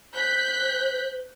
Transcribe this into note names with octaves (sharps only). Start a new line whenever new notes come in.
C5 F#6 G6 B6